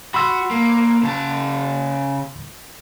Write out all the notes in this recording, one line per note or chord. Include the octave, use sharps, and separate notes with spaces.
F#4 B5 C6 E6
A#3
C#3 A5